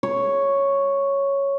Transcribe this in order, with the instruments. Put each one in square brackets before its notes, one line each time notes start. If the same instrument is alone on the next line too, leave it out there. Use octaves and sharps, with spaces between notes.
[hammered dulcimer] C#5